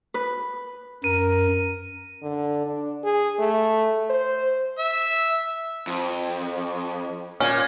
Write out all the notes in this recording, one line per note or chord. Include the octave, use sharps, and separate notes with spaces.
B4
F#2 A#4 D#7
D3
D4
G#4
A3
C5
E5
F2
A#2 C#4